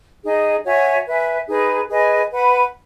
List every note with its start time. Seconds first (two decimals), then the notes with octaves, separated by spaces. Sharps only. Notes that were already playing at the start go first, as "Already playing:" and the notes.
0.23 D#4 G#4 D#5
0.64 F#4 C#5 E5 G#5
1.06 B4 E5 G#5
1.47 D#4 G#4 B4
1.89 G#4 B4 D#5 G#5
2.30 B4 F#5 B5